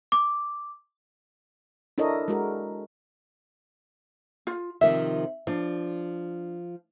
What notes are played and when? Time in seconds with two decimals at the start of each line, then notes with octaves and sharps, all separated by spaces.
0.12 D6
1.98 D4 E4 A4 A#4 C#5 D#5
2.28 G#3 F#4 A#4
4.47 F4
4.81 C3 D#3 F3 E5
5.47 F3 D4